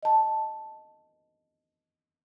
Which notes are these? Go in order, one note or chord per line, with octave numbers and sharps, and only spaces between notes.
D#5 A5